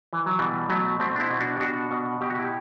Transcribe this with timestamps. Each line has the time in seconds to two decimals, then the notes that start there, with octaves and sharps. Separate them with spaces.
0.13 E3
0.26 F#3
0.39 B2 E3 G3
0.69 B2 F#3 A3
1.00 B2 A3 C4
1.16 D4
1.20 C4 E4
1.30 B2
1.40 D4 F#4
1.56 G4
1.60 B2 D4 F#4
1.91 B2
2.21 B2 G4
2.30 F#4
2.39 E4 G4